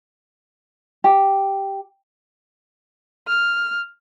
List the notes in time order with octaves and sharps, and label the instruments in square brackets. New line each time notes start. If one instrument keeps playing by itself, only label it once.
[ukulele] G4
[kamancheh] F6